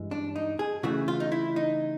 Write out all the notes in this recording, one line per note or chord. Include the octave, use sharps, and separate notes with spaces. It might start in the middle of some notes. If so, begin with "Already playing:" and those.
Already playing: G2 E3 G#3
D4
D#4
G#4
C#3 E3 A3 F#4
F4
D#4
E4
D#4